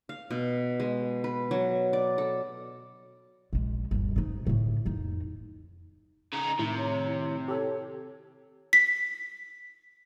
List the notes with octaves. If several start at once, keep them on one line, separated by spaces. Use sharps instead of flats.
F5
B2
G#3
B4
F#3
D5
A4
A#1 G#3
G1 D#2
G#2 D#4
A2 D3
F2 D#4
C#3 D#4 A#5
A2 C3 D#3 E4
C#5
G4 A4 C#5
B6